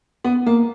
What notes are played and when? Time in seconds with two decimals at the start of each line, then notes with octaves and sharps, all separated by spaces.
0.24 B3
0.46 A#3